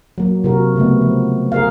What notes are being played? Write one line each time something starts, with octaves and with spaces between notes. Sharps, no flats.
F#3 A#3
C3 F#4 A#4
C#3 A3 B3
F3
G#4 A#4 F5